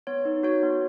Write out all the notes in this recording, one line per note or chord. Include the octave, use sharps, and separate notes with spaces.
B3 C#5
D#4
F#4 C#5
B3